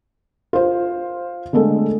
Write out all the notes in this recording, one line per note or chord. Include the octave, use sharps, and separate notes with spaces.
F4 C5
D3 G#3 A3 A4